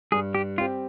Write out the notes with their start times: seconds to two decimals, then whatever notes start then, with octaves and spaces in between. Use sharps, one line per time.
0.12 G2 G#4
0.34 G4
0.58 G3 C4 F4 G4